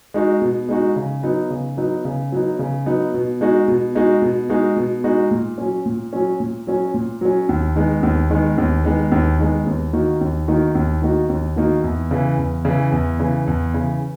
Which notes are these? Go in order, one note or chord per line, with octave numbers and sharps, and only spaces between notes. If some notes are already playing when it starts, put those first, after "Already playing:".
G#3 D#4 F#4
B2
G#3 D#4 F#4
C#3
F#3 B3 D#4
C#3
F#3 B3 D#4
C#3
F#3 B3 D#4
C#3
F#3 B3 D#4
B2
G#3 D#4 F#4
B2
G#3 D#4 F#4
B2
G#3 D#4 F#4
B2
G#3 D#4 F#4
A#2
F#3 C#4
A#2
F#3 C#4
A#2
F#3 C#4
A#2
F#3 C#4
D#2
D#3 G#3 B3
D#2
D#3 G#3 B3
D#2
D#3 G#3 B3
D#2
D#3 G#3 B3
D#2
D#3 A#3 D#4 F#4
D#2
D#3 A#3 D#4 F#4
D#2
D#3 A#3 D#4 F#4
D#2
D#3 A#3 D#4 F#4
E2
C#3 E3
E2
C#3 E3
E2
C#3 E3
E2
C#3 E3